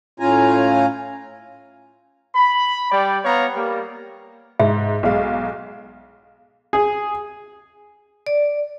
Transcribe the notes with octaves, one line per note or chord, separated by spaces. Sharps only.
A2 C#4 F4 G#5 A#5
B5
G3 D5 G5
B3 C#5 F5 A#5
G3 A#3
G#2 E5
B1 G#3 F5
G#4
D5